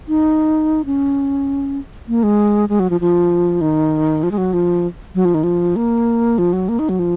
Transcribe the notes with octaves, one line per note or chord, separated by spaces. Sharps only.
D#4
C#4
A#3
G#3
G#3
F#3
F3
F3
D#3
F3
G#3
F#3
F3
F#3
F3
D#3
F3
A#3
F3
F#3
A#3
D#4
F#3
F3